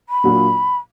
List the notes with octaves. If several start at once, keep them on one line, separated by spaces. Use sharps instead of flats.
B5
A#2 F#3 A#3 D4 F#4